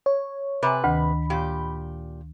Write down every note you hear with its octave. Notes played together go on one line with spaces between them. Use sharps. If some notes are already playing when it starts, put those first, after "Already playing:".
C#5
C3 B4 G#5 A#5 D6
D2 D#3 B5
A#2 G4